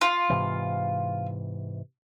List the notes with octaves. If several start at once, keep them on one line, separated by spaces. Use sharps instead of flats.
F4
G#2 C3 E3